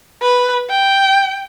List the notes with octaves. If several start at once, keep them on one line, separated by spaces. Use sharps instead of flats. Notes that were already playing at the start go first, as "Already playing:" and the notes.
B4
G5